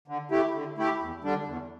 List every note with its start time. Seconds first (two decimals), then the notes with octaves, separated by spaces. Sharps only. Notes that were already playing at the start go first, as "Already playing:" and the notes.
0.08 D3
0.31 A3 E4 G4
0.54 D3
0.77 A3 E4 G4
1.01 E2
1.24 D3 G3 D4
1.47 E2